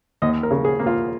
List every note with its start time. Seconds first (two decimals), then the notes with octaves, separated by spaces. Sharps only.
0.22 D#2 D#5
0.43 A#4
0.51 C#3
0.65 G#4
0.79 A#3
0.86 F4